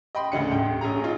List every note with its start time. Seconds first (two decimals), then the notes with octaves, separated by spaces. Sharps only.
0.15 D#5 G5 B5 C6
0.32 D2 C#3 D4 C#7
0.51 D#1 A1 G5
0.81 A#1 C#4 G#4 A#5
1.04 D#4 F4